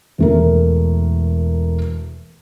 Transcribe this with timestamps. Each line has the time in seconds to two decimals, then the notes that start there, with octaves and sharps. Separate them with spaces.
0.18 E1 A3 A#4